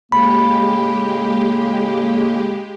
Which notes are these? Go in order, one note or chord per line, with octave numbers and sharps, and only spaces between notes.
A2 C#3 G#3 A#3 G4 B5